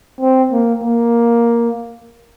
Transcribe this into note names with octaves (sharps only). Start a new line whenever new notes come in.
C4
A#3
A#3